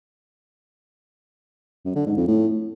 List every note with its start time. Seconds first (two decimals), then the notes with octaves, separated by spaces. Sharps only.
1.85 F#2
1.95 D3
2.06 G#2
2.17 F2
2.27 A2